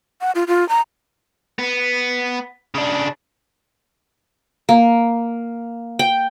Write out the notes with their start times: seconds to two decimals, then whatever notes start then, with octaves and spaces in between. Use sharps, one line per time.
0.21 F#5
0.35 F4
0.48 F4
0.69 A#5
1.59 B3
2.75 C#3 D4
4.69 A#3
5.99 G5